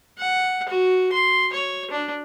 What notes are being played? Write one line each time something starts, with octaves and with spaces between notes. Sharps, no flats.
F#5
F#4
C6
C#5
D4